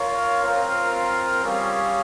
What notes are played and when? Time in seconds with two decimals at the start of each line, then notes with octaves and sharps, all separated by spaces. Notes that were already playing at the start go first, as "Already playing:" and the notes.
Already playing: F4 A#4 C#5 F5
0.42 C4 F4 A#4 F5
1.43 G3 C#4 G#4 C#5 F5